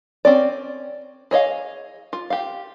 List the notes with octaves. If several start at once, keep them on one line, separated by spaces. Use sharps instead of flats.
C4 C#4 D5
G#4 C#5 D#5 F5
F4
G4 F5